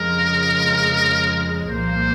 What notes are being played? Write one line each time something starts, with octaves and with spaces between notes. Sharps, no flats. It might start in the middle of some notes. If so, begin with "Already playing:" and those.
Already playing: F2 C#3 F3 G#3 A#4
C2 A#2 F3 A#3 C5